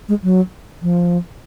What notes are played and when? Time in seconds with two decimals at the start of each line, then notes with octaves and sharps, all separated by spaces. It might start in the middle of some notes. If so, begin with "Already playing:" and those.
0.09 G#3
0.23 F#3
0.82 F3